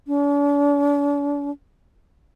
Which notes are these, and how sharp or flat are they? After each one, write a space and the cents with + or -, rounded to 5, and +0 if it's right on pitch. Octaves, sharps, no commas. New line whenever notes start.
D4 -45